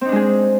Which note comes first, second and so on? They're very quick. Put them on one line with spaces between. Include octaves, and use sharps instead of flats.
C4 D#4 D4 G#3 G#4